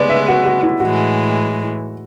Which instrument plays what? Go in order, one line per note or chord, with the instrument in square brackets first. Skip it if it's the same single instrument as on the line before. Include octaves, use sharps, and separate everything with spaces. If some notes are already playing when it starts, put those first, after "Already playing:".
Already playing: [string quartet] C#3 G#3 B3 [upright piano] B4 D5
[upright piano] E5
F#4
F#4
E4
[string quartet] A2 E3 G#3 [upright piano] F#4